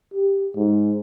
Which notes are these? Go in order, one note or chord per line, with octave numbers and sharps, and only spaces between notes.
G4
G#2